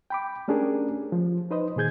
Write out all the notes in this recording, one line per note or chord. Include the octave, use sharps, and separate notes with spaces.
G5 B5 D6
A3 C#4 D4 G4 G#4 A#4
F3
D#4 B4 C5 D#5
A#2 D#3 G#4 G6 G#6